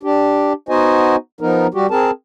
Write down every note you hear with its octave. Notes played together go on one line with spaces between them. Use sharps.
D4 G4
B3 D#4 F#4 C5 D#5 G#5
F3 B3 D#4 A#4
G3 F#4 G4
C4 G#4 A#4 A5